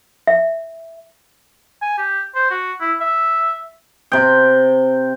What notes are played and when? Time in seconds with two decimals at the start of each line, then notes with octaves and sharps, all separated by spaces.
0.27 E5
1.82 G#5
1.98 G4
2.35 C5
2.51 F#4
2.80 E4
3.01 E5
4.12 C3 G5